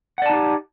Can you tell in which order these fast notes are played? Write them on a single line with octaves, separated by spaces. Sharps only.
F#5 D5 A5 D#4 G4